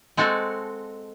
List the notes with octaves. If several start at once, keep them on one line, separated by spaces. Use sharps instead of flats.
G#3 C4 F#4 A4